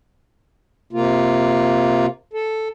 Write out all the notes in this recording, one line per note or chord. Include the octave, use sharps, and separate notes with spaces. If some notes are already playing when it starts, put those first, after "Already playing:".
C3 A#3 F4
A4